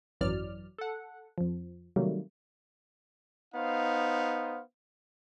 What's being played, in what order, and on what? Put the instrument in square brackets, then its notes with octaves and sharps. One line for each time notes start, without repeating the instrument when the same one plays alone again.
[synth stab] G#1 F#2 E3 F#3 D5 F6
A4 F#5
F2 F3
C3 D#3 F#3 G3 A3 A#3
[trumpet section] B3 D#4 C5 F5